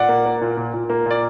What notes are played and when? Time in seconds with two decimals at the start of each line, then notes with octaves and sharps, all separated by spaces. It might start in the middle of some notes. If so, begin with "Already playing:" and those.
Already playing: A#2 D5 F#5
0.09 A#3
0.26 A#3
0.42 A#2
0.57 A#2
0.74 A#2
0.90 A#3
1.06 A#2 D5